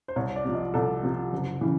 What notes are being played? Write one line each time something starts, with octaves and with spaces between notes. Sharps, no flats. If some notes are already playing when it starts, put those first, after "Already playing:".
C5
C2 C#5
D5
C3 F3
D#5
C2 A4
C3 F3
F#1
C#3 E3